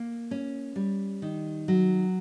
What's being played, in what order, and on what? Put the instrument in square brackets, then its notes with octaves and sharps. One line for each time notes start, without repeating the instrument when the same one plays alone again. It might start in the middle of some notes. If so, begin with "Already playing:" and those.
Already playing: [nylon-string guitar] A#3
C#4
G3
D#3
F#3